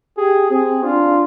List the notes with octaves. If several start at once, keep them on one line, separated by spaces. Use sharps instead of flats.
G4 G#4
C4 G#4
D4 F4